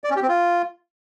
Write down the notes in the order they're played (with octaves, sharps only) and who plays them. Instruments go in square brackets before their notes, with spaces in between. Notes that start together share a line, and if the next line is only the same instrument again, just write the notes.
[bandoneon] D5
C#4
G4
C4
F4